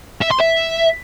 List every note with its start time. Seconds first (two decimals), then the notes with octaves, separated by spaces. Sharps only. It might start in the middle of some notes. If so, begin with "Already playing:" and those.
0.21 E5
0.30 C6
0.40 E5